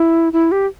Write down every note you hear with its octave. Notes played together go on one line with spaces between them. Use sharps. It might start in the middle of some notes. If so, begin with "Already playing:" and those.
Already playing: E4
E4
G4